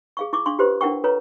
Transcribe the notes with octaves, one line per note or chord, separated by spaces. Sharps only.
G#4 F5 C#6
E4 C#6 D6
D4 F5 C6 C#6
F4 G4 B4 C5 C6
D4 E4 A#4 F#5 G5 C#6
F4 A4 B4 C#5 A#5